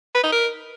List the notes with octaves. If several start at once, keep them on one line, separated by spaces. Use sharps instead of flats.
B4
D#4
A#4